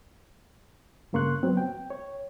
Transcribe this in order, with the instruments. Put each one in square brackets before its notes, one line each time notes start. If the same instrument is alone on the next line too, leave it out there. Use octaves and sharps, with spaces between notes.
[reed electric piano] G2 C#3 A#3 C6 C#6 F#6
F#3 B3 C4
G5
C#5